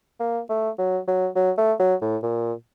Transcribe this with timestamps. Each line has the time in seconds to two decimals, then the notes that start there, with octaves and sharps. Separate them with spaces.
0.20 A#3
0.50 A3
0.79 F#3
1.08 F#3
1.36 F#3
1.58 A3
1.80 F#3
2.02 A2
2.23 A#2